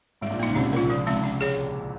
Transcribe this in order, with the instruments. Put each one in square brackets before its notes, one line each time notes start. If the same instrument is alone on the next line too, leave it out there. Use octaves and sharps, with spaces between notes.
[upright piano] G#1 G#2 [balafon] G3
[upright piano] A#1 A#2
[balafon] A#3 D#4
[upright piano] C#2 C#3
[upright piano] C2 C3 [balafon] C#4
[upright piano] A#1 A#2 [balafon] F4 A#4
[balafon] F3
G#3 C4 D#4
C#4
G#4 C#5